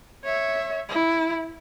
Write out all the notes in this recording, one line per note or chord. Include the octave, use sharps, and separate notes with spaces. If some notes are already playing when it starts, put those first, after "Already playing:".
C#5 E5
E4